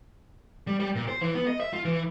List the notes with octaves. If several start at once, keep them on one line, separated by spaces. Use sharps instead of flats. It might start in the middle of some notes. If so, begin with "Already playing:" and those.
G3
G3
A#2
C5
E3
B3
D#5
E5
F4
E3